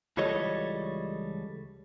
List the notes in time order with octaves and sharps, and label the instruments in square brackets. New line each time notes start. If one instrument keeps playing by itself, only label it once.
[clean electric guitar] C#2 E3 G3 A4 C#5 D#5